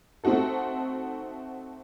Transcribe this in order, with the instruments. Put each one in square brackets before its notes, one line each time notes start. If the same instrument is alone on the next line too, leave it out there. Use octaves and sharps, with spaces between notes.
[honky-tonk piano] A3 C4 D#4 F#4 A4